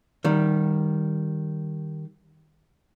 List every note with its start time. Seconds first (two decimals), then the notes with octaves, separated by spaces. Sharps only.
0.24 D#3 G3